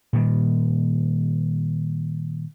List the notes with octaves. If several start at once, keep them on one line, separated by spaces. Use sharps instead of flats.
A#2 D#3 G3